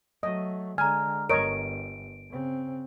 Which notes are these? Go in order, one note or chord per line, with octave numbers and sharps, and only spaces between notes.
F#3 A3 D#5
D3 G#3 G#5 A#5 F6
G1 A#4 C#5 D#5 D7
C#3 C4